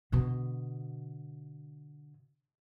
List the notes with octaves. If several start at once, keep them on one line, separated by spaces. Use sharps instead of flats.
B2 D3